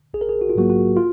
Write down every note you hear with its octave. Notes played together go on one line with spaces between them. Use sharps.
A#1 G#4
A#4
G#4
F#4
F4
G#2 F#3 A#3 F#4
F#4
F4